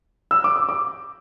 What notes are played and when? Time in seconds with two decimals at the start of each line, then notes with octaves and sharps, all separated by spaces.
0.31 E6
0.44 D6
0.56 D6
0.69 D6